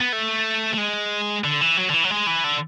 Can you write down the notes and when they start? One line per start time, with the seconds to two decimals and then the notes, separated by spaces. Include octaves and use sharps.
0.01 B3
0.13 A3
0.74 A3
0.78 G#3
1.44 D3
1.61 E3
1.77 F#3
1.90 D3
1.94 E3
2.04 F#3
2.10 G#3
2.27 E3
2.44 D3